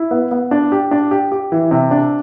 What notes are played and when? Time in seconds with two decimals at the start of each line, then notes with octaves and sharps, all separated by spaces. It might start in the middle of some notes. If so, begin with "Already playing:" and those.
Already playing: E4
0.11 B3
0.31 B3
0.51 D4
0.72 G4
0.91 D4
1.11 G4
1.32 G4
1.52 E3
1.71 C3
1.91 D4